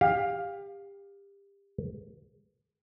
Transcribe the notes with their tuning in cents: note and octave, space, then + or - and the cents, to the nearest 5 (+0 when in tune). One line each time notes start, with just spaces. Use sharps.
G4 +25 F5 +10